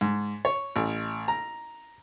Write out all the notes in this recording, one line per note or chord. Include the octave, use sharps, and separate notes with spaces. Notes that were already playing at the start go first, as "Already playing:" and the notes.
G#2
C#5
A1
A#5